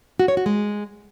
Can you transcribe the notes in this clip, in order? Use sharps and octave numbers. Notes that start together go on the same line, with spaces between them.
F#4
C#5
F#4
G#3